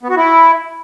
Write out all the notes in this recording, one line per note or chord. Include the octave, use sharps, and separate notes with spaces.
B3
F#4
E4